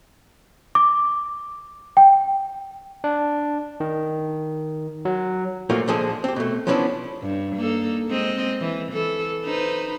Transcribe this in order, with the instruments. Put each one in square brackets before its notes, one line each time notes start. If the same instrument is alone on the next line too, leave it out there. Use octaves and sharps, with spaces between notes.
[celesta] D6
G5
[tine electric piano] D4
D#3
F#3
[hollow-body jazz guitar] A#2 F3 A3 A#3 F4 F#4
A#2 D3 F3 G#3 G#4 A4
C4 G4
B2 A3
F3 F#3 B3 C#4 D4 E4
[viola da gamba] G2
A#3 D#4 A4
G#3 C4 D#5
E3
E3 A4
D#4 B4 C5